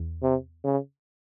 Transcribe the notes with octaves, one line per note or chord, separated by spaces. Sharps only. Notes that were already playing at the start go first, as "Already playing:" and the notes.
Already playing: E2
C3
C#3